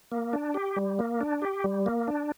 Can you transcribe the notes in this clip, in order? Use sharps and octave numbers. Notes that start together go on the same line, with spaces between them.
A#3
D4
G4
G3
A#3
D4
G4
G3
A#3
D4